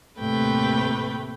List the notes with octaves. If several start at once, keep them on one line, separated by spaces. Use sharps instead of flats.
D#2 A2 C3 A3 B4 G5